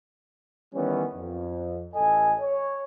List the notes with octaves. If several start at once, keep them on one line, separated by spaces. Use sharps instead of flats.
D#3 E3 G3 B3 C#4
F2
A1 A4 D#5 G#5
C#5